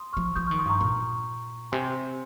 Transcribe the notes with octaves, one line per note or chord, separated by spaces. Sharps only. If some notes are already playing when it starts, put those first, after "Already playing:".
Already playing: C6 D#6
F3 C#6 F6
F3 D#6 G6
C#6 F6
D#3
C6 D#6
G2 A#5 C#6
A#2
C3 G#5 C6